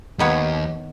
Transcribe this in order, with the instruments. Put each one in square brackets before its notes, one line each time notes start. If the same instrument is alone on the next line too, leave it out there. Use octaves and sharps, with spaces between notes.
[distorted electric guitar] D#2 [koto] D#3 B3 C#5